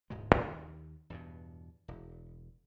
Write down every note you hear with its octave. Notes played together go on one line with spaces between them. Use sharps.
D1 G#2 B2 G#3
D#2
E2 G2 B2
E1